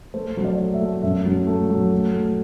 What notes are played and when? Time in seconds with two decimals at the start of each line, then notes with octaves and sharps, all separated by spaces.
0.14 A3 C5
0.37 F#3
0.45 D5
0.58 A3
0.74 E5
0.81 A3
1.03 F#2 E5
1.25 F#3
1.47 A3
1.70 F#3
1.92 A3
2.14 A3